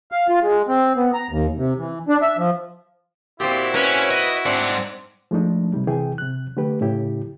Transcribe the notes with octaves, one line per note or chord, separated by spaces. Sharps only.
F5
F4
G#3
C4
B3
A#5
D#2
C3
E3
D4
E5
F3
A#2 C4 E4 F#4 G4
C#4 B4
D#5
G#2 C4 D4 F#5
F3 G#3 A3 D4 D#4
C3 G3
C3 E3 G#4 G5
C3 F#6
D3 A3 G4 B4
A2 C#3 E4 G4